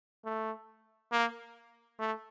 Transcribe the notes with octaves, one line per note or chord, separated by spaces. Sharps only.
A3
A#3
A3